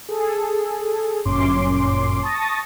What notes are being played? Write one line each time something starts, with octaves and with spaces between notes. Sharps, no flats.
G#4 A4
G1 F#2 A#2 C#4 C6 D6
A5 C#6 D#6 A6 A#6